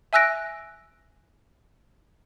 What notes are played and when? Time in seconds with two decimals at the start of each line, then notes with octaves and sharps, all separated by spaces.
0.13 E5 G#5 E6 F#6 A#6 D7